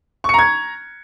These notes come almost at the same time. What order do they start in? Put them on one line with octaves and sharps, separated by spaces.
C#6 C#7 A#5 G#6